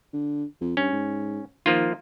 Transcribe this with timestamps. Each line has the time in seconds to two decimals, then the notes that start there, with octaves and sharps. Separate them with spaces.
0.13 D3
0.61 F2
0.77 G2 C#4
0.93 G#2
1.66 D#3 F3 A#3 F4